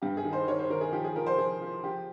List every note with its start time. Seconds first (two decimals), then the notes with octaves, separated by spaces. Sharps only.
0.02 G2 G4
0.17 G#4
0.25 D#3
0.33 C5
0.47 D#3 C#5
0.59 C5
0.70 D#3 A#4
0.81 G#4
0.93 F3 G4
1.04 G#4
1.16 F3 A#4
1.27 C5
1.38 F3 G#4
1.61 F3
1.83 F3 G4